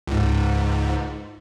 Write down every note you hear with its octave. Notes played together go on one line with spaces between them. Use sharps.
C#2 G#2